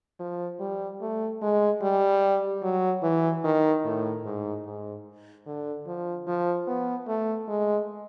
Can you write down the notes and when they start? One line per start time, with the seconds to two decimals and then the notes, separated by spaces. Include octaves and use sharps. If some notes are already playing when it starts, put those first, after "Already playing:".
0.19 F3
0.60 G3
1.01 A3
1.42 G#3
1.82 G3
2.63 F#3
3.03 E3
3.44 D#3
3.85 A2
4.25 G#2
4.66 G#2
5.46 D3
5.87 F3
6.27 F3
6.67 B3
7.08 A3
7.48 G#3